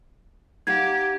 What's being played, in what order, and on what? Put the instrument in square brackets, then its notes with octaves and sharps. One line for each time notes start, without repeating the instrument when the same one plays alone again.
[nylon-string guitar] D#4 F5 F#5 [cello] G4 [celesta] G#6